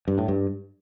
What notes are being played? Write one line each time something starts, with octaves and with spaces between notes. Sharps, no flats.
G2
A2
G2